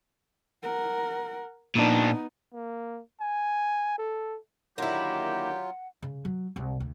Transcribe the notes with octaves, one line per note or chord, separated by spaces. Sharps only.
A#4 F#5
A#2 B3 D4 D#4
A#3
G#5
A4
D3 D#3 F#3 A#3 E4 F4 G4 F#5
C#3
F#3
C2 C3
D2